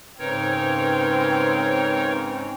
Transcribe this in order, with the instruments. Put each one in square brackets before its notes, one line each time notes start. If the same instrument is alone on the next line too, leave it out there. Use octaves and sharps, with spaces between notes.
[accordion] G#2 C#3 [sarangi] C4 [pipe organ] D#4 A#4 C#5 [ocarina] B4